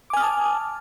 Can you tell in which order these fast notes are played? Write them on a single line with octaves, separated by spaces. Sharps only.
D6 G#5 F6 D#6 A5